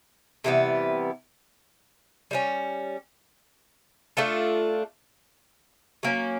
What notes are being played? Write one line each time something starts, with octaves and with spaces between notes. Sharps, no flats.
C3 E3 G3 B3
G3 A#3 C#4
A3 D4 F4 A4
F#3 A#3 C#4